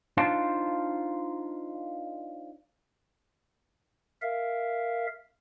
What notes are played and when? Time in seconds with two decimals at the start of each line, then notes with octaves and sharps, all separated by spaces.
0.17 D4 D#4 F4 C5 F5 A5
4.22 A#4 E5 F5